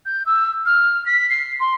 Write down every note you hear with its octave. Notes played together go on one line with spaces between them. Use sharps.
G6
E6
F6
B6
C7
C6